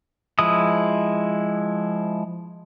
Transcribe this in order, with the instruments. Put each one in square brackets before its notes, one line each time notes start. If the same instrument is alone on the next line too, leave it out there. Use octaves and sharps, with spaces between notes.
[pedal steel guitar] F3 G#3 E4 D#6